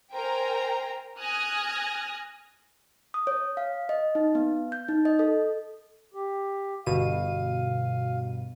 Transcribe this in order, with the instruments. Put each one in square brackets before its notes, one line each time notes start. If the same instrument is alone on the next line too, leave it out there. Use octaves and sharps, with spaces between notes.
[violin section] A#4 C5 G5 G#5 A#5
G#5 D#6 F6 F#6 G#6 A#6
[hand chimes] D#6
C#5
F5
D#5
D#4
B3
G6
D#4
D#5
A4
[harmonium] G4
[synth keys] G1 B2 D#7 [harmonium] F5